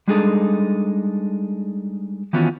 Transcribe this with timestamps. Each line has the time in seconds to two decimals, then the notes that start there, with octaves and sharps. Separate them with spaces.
0.08 G3 G#3 D4 D#4 G#4 A4
2.33 D#3 E3 B3 C#4 F4 F#4